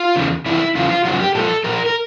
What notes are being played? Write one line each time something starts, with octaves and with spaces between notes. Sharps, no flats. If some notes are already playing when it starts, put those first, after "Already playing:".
Already playing: F4
E2 C#3 F3
F2 C3 E3 E4
E2 C#3 F3 F4
F4
F#2 C#3 F3 F#4
G4
A#2 F3 A4
A#2 F3 A#4
A#4